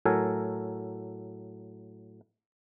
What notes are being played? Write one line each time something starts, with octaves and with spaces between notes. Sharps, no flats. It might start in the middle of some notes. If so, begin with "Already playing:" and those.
A2 F#3 A4 A#4 G#5